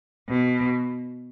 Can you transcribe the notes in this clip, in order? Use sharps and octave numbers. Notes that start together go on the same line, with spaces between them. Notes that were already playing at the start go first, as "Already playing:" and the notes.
B2